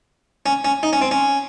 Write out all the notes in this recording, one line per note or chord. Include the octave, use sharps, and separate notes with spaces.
C#4
C#4
D#4
C#4
C4
C#4